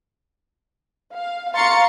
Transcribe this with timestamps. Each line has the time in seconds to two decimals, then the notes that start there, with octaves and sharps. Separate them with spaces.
1.15 F5
1.54 F5 A#5 C6 C#6 A6 C#7